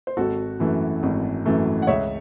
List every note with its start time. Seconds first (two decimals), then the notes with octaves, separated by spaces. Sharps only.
0.07 C5
0.17 G#1 F#4 A4
0.60 F#2 E3 A3
1.03 G#1
1.45 F#2 E3 A3
1.82 F#5
1.87 C#2 C#5 E5